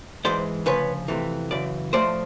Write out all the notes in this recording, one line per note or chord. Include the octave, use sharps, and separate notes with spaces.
G#2 E3 G#3 C5 D5
D2 C#3 F3 B4 C#5
F2 C3 E3 A3
F#2 C#3 E3 D5
A2 F3 A3 C5 D5